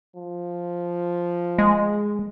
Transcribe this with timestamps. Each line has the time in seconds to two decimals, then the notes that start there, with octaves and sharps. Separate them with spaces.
0.16 F3
1.58 G#3